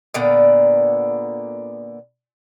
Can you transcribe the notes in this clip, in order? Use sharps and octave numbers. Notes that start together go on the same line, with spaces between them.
A#2 D3 B3 D5